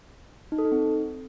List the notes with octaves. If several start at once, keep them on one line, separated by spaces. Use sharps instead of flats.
D#4
A4
D#4
C4